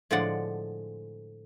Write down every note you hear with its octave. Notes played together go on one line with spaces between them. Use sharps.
A2 D3 F3 G#3 D5 F#5